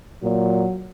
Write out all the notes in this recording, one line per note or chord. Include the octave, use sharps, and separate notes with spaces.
A#2 F#3